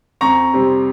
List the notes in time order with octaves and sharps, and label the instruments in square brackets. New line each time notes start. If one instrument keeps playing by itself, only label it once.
[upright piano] F2 [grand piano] A#5 C#6
[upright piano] C3 G3 C4